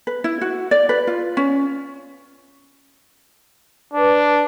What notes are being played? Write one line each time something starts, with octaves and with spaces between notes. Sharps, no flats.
B4
E4
F#4
D5
B4
F4
C#4
D4 B4